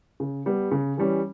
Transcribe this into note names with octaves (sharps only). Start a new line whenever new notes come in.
C#3
G3 B3
C#3
E3 G3 C#4